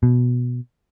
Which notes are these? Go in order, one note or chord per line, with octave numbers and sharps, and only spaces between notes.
B2